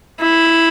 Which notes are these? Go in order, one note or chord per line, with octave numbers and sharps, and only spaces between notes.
E4